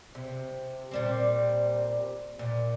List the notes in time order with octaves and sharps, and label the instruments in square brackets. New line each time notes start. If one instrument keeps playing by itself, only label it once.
[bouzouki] C3
A#2 G3 C4
A#2